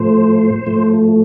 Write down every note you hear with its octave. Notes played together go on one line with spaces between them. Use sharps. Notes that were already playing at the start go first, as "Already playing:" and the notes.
Already playing: A2 F3 A3 C5
A2 F3 A3